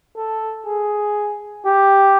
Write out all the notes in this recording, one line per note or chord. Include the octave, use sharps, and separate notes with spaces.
A4
G#4
G4